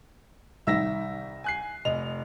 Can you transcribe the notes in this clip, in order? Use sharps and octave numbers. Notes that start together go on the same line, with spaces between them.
C2 D#3 E5 E6 A#6
G#5 F#6 C7
F1 D#5 F7